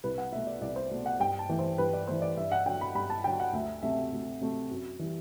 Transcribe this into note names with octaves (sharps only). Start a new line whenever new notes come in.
C2 B4
F#5
B2 A3 E5
D5
C2 D5
C5
B2 A3
F#5
G2 G5
A5
E3 A3
C5
G2 B4
D5
E3 A3 C5
D5
G2 E5
F#5
D3 F#3 G5
B5
G2 B5
A5
D3 F#3 G5
F#5
D2 E5
C3 F#3 A3 E5
D2
C3 F#3 A3
F#2
E3 G3